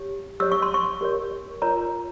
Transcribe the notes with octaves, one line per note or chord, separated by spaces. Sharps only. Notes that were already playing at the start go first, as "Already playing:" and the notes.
Already playing: G4 C#5
G4 C#5 E6
C#6
C6
C#6
G4 A#4 C#5
F4 A#4 C#5 A#5